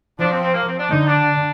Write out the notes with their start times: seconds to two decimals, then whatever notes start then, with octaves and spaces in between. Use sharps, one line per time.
0.18 F3 D4
0.30 C4
0.42 C4
0.54 A#3
0.67 C4
0.78 D4
0.89 D3 D#4
1.07 D4